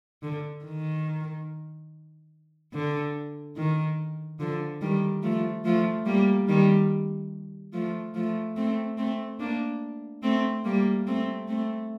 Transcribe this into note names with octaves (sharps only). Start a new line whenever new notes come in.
D3
D#3
D3
D#3
D3 F3
D#3 G3
F3 A3
F3 A3
G3 A#3
D#3 G3
F3 A3
F3 A3
A3 C4
A3 C4
A#3 D4
A3 C4
G3 A#3
A3 C4
A3 C4